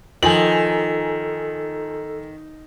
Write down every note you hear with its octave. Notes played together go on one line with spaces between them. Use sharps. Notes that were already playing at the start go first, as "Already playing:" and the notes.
D#3 F3 A4 G#5 E6 F#7